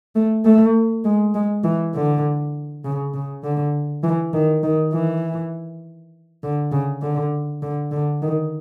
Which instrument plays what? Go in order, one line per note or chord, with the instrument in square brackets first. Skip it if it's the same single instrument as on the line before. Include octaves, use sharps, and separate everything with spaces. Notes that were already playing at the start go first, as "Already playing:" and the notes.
[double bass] A3
A3
G#3
G#3
E3
D3
C#3
C#3
D3
E3
D#3
D#3
E3
D3
C#3
D3
D3
D3
D#3